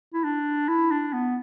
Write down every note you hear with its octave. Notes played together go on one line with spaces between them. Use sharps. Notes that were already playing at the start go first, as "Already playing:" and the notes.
E4
D4
E4
D4
B3